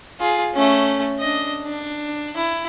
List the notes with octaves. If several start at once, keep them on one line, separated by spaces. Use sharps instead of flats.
F4 G#4
A3 C#4
D4 D#5
D4
E4